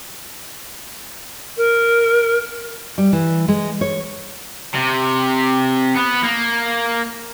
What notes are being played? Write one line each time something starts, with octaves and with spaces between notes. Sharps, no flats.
A#4
G3
E3
G#3
C#5
C3
B3
A#3